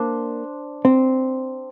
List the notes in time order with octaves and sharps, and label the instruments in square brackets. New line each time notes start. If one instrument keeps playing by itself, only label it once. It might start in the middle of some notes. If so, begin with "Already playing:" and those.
Already playing: [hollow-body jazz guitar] A#3 [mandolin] D4 C5
[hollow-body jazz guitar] C4